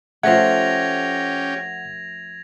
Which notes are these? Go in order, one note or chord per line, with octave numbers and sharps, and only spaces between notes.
F3 A3 C#4 G4 F#5 G#6 A#6 F7